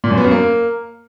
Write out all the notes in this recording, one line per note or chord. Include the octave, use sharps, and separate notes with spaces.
A#2
F#2
B3
F#2
A#3